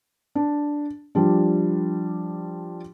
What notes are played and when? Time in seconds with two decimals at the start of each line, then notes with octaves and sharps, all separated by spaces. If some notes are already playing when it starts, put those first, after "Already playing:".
0.35 D4
1.15 F3 G3 D4